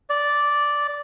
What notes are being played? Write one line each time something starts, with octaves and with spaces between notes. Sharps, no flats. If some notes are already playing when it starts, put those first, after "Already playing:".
D5